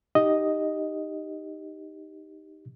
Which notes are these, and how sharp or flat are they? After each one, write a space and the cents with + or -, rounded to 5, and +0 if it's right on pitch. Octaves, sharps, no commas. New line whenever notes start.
D#4 +0 G4 +0 D#5 +0